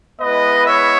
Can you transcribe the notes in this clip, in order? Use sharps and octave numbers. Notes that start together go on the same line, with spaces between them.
G#3 B3 E4 B4 D#5
C#5 E5